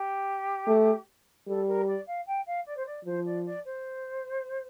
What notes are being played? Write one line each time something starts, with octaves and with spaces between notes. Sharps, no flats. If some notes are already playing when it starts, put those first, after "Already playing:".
Already playing: G4
A3
G3 A4
A#4
D5
F5
G5
F5
D5
C5
D5
F3 C5
D5
D5
C5